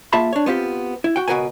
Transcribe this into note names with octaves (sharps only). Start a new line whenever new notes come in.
A#3 F4 G#4 E5 A5 B5
D4 C#5
B3 C4 F4 G4
E4
F#4 G5
C#2 B2 F#4 A#4 B4 G#5